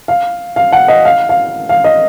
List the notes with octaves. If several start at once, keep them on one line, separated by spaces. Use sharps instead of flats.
F5
F5
F#5
D#5
F5
F5
F5
D#5